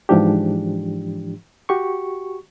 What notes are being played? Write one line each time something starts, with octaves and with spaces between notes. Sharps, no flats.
G#2 E3 F3 D4 G4
F#4 G4 C#6